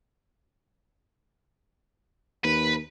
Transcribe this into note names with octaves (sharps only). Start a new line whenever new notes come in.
D#2 B4